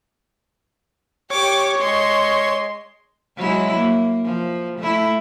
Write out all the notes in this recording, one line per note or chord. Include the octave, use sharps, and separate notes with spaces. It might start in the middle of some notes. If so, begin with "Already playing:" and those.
G4 C#5 D6
G#3 C6
F#3 G#3 E4
A#3
F3
A3 E4